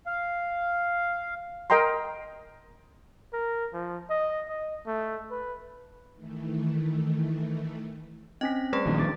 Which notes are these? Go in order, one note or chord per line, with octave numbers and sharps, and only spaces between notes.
F5
A#4 D#5 G5 A#5 C6
A#4
F3
D#5
D#5
A3
B4
D#3 E3 A3
C4 C#4 D#5 B6
G3 A3 G#4 B4
A#1 D#3 F#3
D6 A6